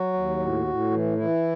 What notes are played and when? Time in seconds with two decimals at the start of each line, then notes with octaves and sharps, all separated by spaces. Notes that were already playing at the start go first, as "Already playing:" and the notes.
Already playing: F#3 F#4
0.13 D#2
0.39 A2
0.66 A2
0.91 E3
1.17 E3 E4